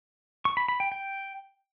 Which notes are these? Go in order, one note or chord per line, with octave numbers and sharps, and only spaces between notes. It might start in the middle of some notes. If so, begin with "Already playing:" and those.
C#6
B5
B5
G5
G5